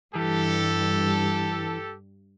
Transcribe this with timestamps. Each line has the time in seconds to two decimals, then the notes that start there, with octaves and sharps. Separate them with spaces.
0.15 G2 E3 G4 A4